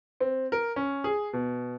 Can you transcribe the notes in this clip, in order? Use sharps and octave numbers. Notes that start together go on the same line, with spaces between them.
C4
A#4
C#4
G#4
B2